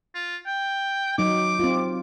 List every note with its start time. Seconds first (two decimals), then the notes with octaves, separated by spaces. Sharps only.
0.15 F4
0.47 G5
1.18 F#3 D#4 D6
1.59 C4 F4